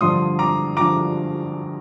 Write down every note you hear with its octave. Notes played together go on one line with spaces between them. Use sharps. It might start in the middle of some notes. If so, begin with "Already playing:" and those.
G2 D3 F3 C6 D#6
A#5 D6
D3 F3 A#5 D6